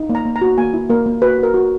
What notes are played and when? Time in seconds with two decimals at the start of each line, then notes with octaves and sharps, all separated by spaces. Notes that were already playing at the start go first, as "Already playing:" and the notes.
Already playing: D#4
0.09 A#3
0.15 A#5
0.25 A#3
0.36 A#5
0.42 F#4
0.58 A#3 G#5
0.74 E4
0.90 A#3 A#4
1.06 A#3
1.22 F#4 B4
1.38 F#4 A#4
1.54 F#4